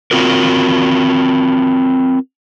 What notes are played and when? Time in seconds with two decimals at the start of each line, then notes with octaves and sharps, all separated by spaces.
0.11 C4 F4 F#4 A#4